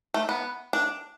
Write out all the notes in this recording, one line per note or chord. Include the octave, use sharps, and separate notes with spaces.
A3
B3
D4